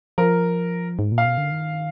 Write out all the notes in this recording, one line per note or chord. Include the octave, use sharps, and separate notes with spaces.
F3 A#4
G#2
A#2
F5
B2
D3
D#3